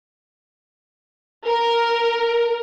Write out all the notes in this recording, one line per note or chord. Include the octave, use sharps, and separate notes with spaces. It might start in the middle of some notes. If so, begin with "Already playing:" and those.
A#4